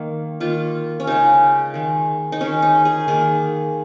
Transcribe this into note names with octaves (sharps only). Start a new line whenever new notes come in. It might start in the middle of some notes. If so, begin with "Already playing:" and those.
Already playing: D#3 A#3
D#3 A#3 F4
C#4
C#3 G#3 D#4
D#3 G#3
D#4
D#3 G#3 C#4
D#4
G#4
D#3 A#3 G#4